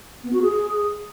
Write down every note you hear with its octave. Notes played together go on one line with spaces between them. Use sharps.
B3
F#4
G#4